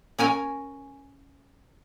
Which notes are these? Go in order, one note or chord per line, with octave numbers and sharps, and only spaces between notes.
C#4 A#4 G#5